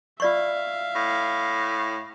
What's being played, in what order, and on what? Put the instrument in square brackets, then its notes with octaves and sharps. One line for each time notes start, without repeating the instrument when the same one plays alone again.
[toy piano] F4 D5 C#6 [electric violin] E5 F5
[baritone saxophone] A2